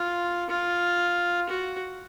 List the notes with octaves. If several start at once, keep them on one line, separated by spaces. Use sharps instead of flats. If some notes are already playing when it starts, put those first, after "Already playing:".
Already playing: F4
F4
F#4